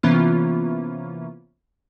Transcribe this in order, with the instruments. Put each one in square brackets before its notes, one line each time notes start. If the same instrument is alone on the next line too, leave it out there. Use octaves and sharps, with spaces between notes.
[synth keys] C3 E3 A#3 B3 C#4 F4